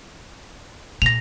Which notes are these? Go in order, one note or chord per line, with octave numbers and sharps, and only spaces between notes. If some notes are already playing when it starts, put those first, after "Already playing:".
A#2 A#6 F7